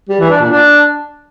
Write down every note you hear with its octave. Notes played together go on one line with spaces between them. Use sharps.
G3
E3
D4
A#2
D4